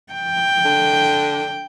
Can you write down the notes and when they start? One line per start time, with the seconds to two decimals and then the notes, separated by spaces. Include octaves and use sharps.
0.12 G5
0.65 D3